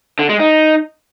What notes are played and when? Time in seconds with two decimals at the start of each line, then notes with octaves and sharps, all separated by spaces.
0.19 D3
0.29 G#3
0.40 D#4